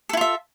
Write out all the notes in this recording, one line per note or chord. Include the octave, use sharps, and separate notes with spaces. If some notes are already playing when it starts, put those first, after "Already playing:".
E4 F4 A4 E5